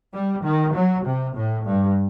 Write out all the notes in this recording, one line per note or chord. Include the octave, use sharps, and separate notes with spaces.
G3
D#3
F#3
C3
A2
G2